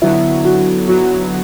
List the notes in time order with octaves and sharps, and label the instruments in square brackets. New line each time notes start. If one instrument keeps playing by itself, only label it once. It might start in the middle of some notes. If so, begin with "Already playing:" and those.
[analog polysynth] D3 F#3 B3 [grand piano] E4
[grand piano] F#4
[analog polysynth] D3 F#3 B3 [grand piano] F#4